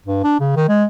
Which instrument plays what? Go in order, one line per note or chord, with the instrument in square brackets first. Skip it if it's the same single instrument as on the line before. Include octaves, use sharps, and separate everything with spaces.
[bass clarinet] G2
D4
C#3
D#3
G#3